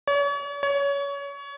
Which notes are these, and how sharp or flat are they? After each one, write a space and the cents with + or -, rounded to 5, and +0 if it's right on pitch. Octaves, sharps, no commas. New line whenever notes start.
C#5 +40
C#5 +25